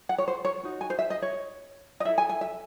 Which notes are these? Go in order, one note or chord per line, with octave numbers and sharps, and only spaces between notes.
F#5
C#5
C5
C#5
D#4 F#4
G#5
C5
E5
D#5
C#5
D#5
E4 A4 E5
G#5
G#5
E5